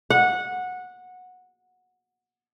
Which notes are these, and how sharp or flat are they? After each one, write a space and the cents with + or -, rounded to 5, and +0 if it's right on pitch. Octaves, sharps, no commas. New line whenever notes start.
F#5 -15